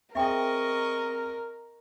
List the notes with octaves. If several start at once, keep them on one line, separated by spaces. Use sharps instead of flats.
C4 G#4 A#4 D#5 E5 G5 C#6